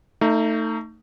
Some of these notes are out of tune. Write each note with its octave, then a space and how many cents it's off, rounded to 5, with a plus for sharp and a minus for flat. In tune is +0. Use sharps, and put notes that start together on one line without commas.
A3 +25 D#4 +0